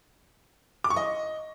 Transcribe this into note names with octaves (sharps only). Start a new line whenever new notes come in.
D6
C#6
D#5